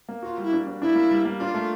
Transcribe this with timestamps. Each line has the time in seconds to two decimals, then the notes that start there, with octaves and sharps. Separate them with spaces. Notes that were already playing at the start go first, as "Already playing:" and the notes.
0.09 A#3
0.23 F4 F#4
0.38 G3
0.43 E4
0.53 D4
0.67 D4
0.82 D4 E4
0.95 A#3
1.11 G3
1.25 A#3
1.39 D4 F4
1.54 A3